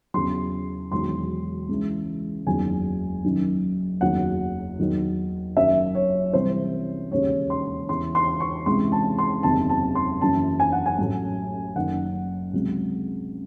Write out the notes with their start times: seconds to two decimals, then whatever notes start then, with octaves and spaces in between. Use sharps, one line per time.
0.14 E2 C#3 F#3 C6
0.91 E1 E2 D#3 F#3 C6
1.69 C#2 C#3 E3
2.47 F#1 E2 D#3 F#3 G#5
3.24 F#1 F#2 D#3 F#3
4.01 F#1 E2 D#3 F#3 F#5
4.79 E2 D#3 F#3
5.56 F#1 F#2 D#3 F#3 E5
5.95 C#5
6.33 C2 C3 E3 C5
7.11 E1 D#2 C#3 C#5
7.50 C6
7.89 E2 C#3 E3 C6
8.15 C6
8.40 C#6
8.66 C#2 C3 E3 C6
8.92 A5
9.18 C6
9.43 F#1 E2 C3 D#3 A5
9.69 A5
9.95 C6
10.21 F#1 F#2 E3 A5
10.60 G#5
10.72 F#5
10.86 G#5
10.98 A1 A2 F#3
11.76 F#1 F#2 D#3 F#5
12.53 C#2 C3 F#3